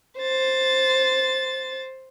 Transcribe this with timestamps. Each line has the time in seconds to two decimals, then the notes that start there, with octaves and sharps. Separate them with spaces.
0.19 C5 A6